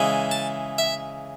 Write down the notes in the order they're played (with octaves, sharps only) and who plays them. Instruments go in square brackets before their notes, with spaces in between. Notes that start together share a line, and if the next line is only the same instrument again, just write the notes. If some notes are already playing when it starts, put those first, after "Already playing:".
Already playing: [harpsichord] C#3 E3 G#3
A5
E5